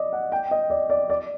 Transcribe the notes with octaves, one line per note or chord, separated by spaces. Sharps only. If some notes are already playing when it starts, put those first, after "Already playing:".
Already playing: D5 D#5
F#5
G5
D#5
D5
D5
D5